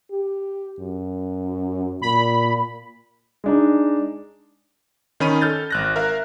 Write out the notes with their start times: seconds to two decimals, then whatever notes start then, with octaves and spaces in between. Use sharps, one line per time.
0.11 G4
0.79 F#2
2.02 A#2 B5
3.44 G#3 D4 D#4
5.20 D#3 C#4 B5 D#7
5.41 A4 F6 G6 A6
5.71 G#1 F#6 A#6
5.96 A#4 E5 F5